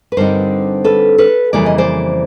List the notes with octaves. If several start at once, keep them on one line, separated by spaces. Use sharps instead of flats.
B4
G2 D3 G3 C4 D#4 A#4 C5
A4 B4
A4 B4
F2 C#3 E3 G3 A#3 D5
D#5
C5 D5